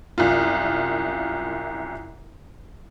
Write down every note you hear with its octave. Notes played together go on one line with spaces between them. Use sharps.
C2 F#2 F4